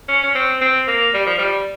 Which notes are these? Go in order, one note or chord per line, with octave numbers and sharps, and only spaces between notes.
C#4
C#4
C4
C4
A#3
G3
F3
G3